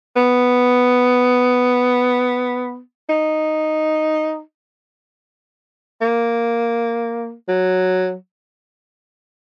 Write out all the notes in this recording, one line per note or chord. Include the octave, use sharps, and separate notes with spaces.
B3
D#4
A#3
F#3